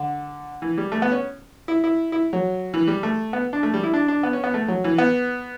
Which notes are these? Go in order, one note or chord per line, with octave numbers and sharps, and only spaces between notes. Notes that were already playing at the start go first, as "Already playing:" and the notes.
Already playing: D3
E3
G3
A3
B3
C#4
E4
E4
E4
F#3
E3
G3
A3
B3
D4
A3
G3
E4
D4
D4
B3
C#4
B3
A3
F#3
E3
B3